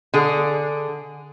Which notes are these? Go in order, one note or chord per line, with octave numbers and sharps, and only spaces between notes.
D3 G#4